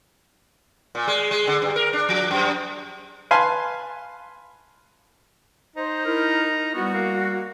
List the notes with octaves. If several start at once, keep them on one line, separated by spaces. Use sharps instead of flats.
A#2
G#3
G#3
D3
G2
A#4
D4
F3
F#2
B4 F5 G#5 A5 C6
D#4 C5
E4 A#4
G3 B3 F#4
A#3